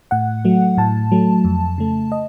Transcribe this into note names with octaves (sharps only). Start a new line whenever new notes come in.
A2 F#5
F#3 A3
A2 A5
F#3 A3
F2
C#3 A3
D#5